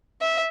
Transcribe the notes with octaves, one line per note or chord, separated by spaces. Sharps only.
E5